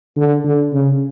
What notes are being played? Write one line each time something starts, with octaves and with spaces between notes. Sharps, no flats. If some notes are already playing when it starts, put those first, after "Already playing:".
D3
D3
C#3